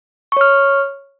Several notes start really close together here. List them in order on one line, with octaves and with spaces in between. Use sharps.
C#6 C#5 F6